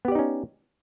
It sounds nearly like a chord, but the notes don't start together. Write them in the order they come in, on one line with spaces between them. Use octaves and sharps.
B3 G4 D5 D#4 C#4